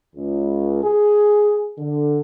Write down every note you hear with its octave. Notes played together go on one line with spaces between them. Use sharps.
C#2
G#4
D3